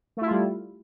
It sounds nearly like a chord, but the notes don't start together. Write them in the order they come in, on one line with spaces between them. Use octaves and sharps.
A3 E4 F4 G3